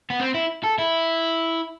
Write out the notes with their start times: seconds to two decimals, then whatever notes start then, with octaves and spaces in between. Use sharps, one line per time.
0.10 B3
0.20 C4
0.34 E4
0.64 A4
0.78 E4